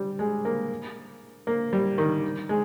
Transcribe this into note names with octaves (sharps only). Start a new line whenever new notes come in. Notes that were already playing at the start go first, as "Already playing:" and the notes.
Already playing: G3
G#3
A#3
A#3
G3
D#3
G#3